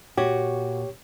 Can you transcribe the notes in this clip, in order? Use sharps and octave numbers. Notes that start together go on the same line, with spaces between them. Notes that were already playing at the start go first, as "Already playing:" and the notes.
A#2 F#4 G4 C#5